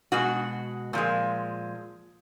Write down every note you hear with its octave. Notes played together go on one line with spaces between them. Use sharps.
B2 G#3 F#4
A#2 F3 G#3